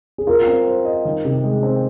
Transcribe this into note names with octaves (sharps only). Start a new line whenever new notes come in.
G#4
F4 A#4
C4
C5
D#5
D#3
C3
G#3
C4